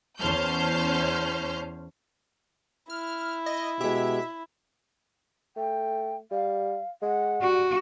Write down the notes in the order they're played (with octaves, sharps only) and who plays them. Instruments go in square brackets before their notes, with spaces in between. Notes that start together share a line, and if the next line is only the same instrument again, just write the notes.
[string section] E2 C#4 C5 A5 F6 G6
[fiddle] E4 [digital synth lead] F6
[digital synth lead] D#5
[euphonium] B2 [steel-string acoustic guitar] G#3 G4 [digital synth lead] E5
[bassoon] A3 [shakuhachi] G5
[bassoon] G3 [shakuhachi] F5
[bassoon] G#3 [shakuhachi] F#5
[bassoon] G3 [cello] F#4